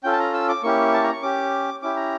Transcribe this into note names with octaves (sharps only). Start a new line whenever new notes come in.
C#4 F4 A4 G5
A5
A#5
E6
D6
A#3 C#4 E4 G4 C#6
A5
A#5
C#6
C#4 G4 D6
C#4 E4 G4 D6
A#5